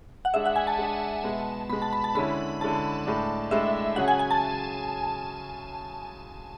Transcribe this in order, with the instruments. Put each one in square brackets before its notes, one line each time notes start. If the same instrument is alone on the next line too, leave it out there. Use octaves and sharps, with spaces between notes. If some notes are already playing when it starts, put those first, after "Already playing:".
[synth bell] F#5
[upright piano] G#3 D4 G#4 [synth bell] E5
[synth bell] F#5
G#5
A5
[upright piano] G#3 D4 G#4
B2 G#3 B3
[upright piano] B2 G#3 B3 [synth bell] B5
[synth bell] A5
B5
A5
[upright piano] D3 G#3 C#4 E4 [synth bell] B5
[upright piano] D3 G#3 C#4 E4 [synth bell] A5
[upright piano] A2 G#3 D4
[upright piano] A2 G#3 D4 [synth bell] E5
[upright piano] C#3 F#3 C#4 G#4 [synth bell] F#5
[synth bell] G#5
G#5
A5